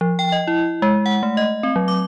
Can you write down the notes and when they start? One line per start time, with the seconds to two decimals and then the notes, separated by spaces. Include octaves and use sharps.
0.01 F3
0.19 G5
0.32 D#5
0.47 E4
0.82 G#3
1.06 F#5
1.23 A3
1.37 D#5
1.63 C4
1.76 F#3
1.88 D6